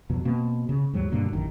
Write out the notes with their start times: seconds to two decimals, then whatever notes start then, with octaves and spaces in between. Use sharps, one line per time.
0.10 F2 B2 D3 F#3
0.25 B2 A#3 C4
0.69 C#3
0.93 D#2 G#2 F#3 G3
1.12 G2 B2 D3 A#3
1.33 A1 F#2 A2 D#3